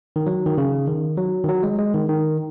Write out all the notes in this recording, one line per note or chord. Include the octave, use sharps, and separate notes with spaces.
D#3
F#3
D#3
C#3
D#3
F#3
D#3
F#3
G#3
G#3
D#3
D#3